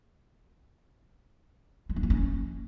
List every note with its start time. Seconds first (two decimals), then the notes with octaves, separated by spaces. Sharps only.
1.89 G#3
1.96 D4
2.03 A#3
2.10 C#4